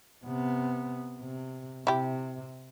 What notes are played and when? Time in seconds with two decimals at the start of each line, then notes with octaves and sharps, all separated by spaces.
0.25 C3 B3
1.20 C3
1.87 C3 E4 G4